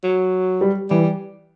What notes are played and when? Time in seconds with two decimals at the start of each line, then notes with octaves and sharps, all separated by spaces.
0.03 F#3
0.61 G3
0.90 E3 G3